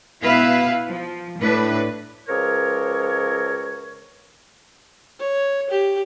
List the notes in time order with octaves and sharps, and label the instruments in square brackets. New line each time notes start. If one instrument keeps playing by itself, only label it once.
[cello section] B2 B3 E4 B4 E5 F5
F3
A2 D4 B4
[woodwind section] C#2 F3 A#4 C#5
[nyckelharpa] C#5
G4